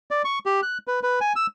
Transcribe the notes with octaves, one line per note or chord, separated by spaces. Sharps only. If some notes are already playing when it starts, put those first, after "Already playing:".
D5
C#6
G4
F#6
B4
B4
G#5
E6